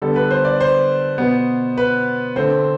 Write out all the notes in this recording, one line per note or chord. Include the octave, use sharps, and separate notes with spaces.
D3 G3 B3 A4
B4
C5
D5
C5
B2 B3
B4
D3 A3 C4 C5